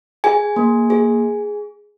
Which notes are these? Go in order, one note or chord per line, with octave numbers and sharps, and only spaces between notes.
G#4 G#5
A#3
G#4